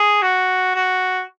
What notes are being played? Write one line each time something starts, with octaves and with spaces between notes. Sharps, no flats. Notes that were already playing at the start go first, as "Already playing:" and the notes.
Already playing: G#4
F#4
F#4